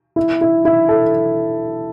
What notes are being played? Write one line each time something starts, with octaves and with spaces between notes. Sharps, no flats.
E4
E4
E4
A4